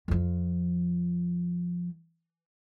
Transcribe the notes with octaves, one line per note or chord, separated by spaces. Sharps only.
F2 F3